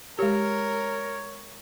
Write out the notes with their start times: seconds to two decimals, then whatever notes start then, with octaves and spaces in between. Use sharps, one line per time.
0.19 G#3 G4 A#4 C#5